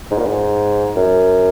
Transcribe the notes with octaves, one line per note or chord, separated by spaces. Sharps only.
G#2
A#2
G#2
F#2